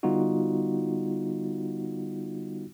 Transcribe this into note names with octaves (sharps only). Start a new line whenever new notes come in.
D3 G3 B3 D#4 F4 F#4